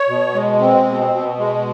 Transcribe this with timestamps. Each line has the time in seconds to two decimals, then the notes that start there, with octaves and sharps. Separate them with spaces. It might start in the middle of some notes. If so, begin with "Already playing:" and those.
Already playing: C#5
0.08 B2
0.35 G#3
0.60 C4
0.86 B2
1.12 B2
1.39 G#3